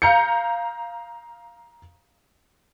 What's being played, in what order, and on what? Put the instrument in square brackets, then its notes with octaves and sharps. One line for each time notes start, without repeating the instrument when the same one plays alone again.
[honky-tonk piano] F5 A#5 G6 C#7